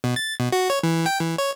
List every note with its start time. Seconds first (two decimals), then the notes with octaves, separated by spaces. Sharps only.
0.04 B2
0.16 A6
0.40 B2
0.52 F#4
0.70 C#5
0.83 E3
1.06 G5
1.20 E3
1.38 C#5